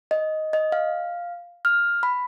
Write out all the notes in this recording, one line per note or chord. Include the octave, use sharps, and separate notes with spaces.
D#5
D#5
F5
F6
B5